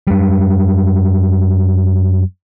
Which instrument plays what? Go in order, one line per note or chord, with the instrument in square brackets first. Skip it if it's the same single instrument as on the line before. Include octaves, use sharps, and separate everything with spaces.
[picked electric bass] F#2 G3